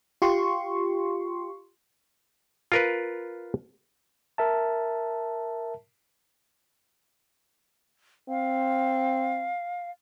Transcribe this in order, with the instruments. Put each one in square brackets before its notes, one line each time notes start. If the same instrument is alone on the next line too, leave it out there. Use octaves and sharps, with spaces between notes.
[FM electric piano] F4 G4 C6 C#6
[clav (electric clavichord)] F4 A#4 B4
[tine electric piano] A#4 E5 A5
[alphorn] C4 [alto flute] F5